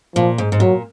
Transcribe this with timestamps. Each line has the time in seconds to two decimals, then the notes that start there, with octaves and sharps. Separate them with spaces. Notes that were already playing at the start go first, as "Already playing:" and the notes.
0.16 A#2 F3
0.38 G#2
0.52 G#2
0.60 A#2 F#3